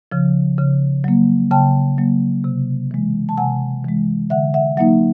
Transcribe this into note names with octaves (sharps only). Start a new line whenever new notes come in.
C#3 F3
C#3
F#3 A#3
C#3 G5 A5
F#3 A#3
C3
E3 G#3
A5
C3 F#5 G#5
E3 G#3
D3 E5 F#5
E5 F#5
F#3 A#3 D#4 E5 F#5